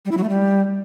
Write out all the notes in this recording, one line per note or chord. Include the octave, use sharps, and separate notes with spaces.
G3
E4
F#3
A3
G3